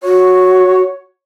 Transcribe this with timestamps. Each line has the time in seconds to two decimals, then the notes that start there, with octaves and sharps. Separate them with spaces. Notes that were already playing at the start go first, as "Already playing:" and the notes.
0.03 F#4 C#5